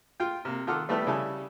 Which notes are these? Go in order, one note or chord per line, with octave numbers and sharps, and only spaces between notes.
F4 G5
C3 A#3
D#3 F4 A4 F#5 D6 F6
G3 A3 B3 E4 G4 A4
C#3 G3 E4 A4 G#5